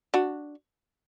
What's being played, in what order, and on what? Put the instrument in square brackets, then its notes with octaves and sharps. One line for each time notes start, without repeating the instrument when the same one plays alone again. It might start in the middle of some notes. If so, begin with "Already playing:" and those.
[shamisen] D4 F#4